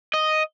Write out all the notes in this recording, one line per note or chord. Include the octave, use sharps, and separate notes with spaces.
D#5